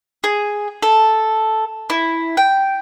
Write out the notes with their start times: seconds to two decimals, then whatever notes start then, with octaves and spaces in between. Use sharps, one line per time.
0.24 G#4
0.83 A4
1.90 E4
2.37 G5